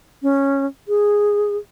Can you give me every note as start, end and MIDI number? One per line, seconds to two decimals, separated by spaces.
0.23 0.66 61
0.88 1.57 68